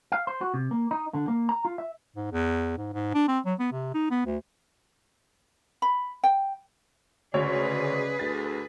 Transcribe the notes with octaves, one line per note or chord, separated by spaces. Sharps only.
F5
C5
F#4
C3
A#3
D#4
D3
A#3
A#5
F4
E5
G#2
E2
G#2
G#2
D4
C4
F#3
B3
C3
D#4
B3
D2
B5
G5
D2 C#3 G#3 G#4 B4 C#5 D5
D2 A6